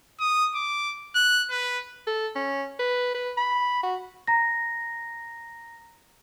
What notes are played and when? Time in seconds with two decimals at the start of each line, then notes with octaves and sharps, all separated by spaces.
0.20 D#6
0.55 D6
1.15 F#6
1.50 B4
2.07 A4
2.36 C#4
2.79 B4
3.15 B4
3.37 B5
3.83 F#4
4.27 A#5 A#6